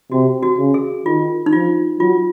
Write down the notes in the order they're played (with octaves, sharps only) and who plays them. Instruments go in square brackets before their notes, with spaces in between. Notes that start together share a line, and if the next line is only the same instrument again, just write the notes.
[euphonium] C3 [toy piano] F#4
[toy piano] F#4
[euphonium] C#3
[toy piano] G#4
[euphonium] D#3 [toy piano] F4
[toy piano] D#4
[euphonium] F3 [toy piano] F4
[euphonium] F#3 [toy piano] F4